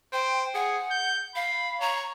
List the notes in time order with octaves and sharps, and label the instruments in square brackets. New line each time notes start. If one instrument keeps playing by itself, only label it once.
[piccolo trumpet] C5 [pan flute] G5
[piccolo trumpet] G#4 [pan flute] F#5
[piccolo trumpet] G6
[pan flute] F5 [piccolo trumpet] B5
[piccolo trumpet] C#5 [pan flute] A#5